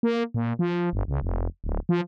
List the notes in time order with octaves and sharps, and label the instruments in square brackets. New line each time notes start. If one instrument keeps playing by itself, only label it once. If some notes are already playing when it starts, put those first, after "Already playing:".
[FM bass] A#3
A#2
F3
G1
C#2
F1
D1
F3